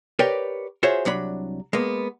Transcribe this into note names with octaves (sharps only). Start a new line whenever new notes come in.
G4 A#4 B4 C#5 D5 G5
F4 F#4 G#4 C5 C#5 E5
C2 F#3 D4 B5
G#3 A#3 B3